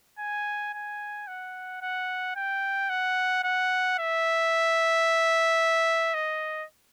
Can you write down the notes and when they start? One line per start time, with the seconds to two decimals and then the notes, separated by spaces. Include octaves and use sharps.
0.19 G#5
0.73 G#5
1.27 F#5
1.82 F#5
2.36 G5
2.90 F#5
3.44 F#5
3.99 E5
6.14 D#5